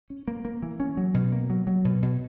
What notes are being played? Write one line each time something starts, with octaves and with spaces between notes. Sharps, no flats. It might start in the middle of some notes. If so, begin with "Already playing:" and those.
C#4
A#3
A#3
E3
C#4
F#3
B2
A#3
F#3
F#3
B2
B2